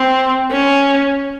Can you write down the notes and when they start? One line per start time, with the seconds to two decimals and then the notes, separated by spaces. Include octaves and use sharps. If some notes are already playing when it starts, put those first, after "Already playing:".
Already playing: C4
0.51 C#4